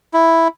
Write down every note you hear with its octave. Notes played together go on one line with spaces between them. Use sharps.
E4